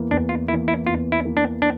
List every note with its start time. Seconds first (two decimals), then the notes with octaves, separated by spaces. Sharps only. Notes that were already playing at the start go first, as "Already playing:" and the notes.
Already playing: E2 E3 A#3
0.11 E2 D4
0.29 F4
0.48 A#3 E4
0.53 E3
0.68 E4
0.86 E2 F4
1.12 E4
1.25 E3 A#3
1.37 D4
1.62 D4